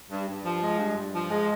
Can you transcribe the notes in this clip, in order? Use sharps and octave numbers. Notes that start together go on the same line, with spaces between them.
G2
G2
F3
G#3
G2
G2
F3
G#3